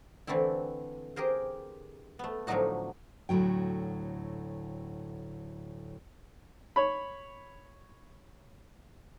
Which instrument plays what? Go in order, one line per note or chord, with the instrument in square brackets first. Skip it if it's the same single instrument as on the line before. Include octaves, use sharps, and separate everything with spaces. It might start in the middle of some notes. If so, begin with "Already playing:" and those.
[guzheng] D3 E3 A3 C4 E4
G4 G#4 A#4 C5
A3 B3
A2 D3 F3 F#3 D#4 F#4
[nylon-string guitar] D2 A2 F#3 G5
[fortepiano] C#5 B5